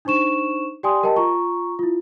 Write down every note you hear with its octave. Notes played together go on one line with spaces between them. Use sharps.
D4 D#4 C5 C#6 E7
G4 D5 G5 G#5 C6 D#6
G4 A#4 D#5 G5 A5
F4 A#5 C#6
E4 F4